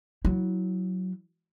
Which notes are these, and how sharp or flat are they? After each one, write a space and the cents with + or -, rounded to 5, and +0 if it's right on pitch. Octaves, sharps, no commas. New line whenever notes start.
F#3 +0 E4 -20